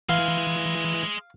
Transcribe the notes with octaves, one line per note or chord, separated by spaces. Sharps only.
E3 G#4 F5 C6